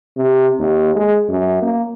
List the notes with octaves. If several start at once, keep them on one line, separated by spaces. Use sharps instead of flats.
C3
D#2
G#3
F#2
A#3